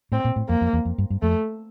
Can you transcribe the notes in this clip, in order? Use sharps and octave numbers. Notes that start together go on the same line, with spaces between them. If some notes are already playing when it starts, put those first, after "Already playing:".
A2 C4
A#2
A2
F2 A#3
F2
E2
F2
G2
G2
F2 A3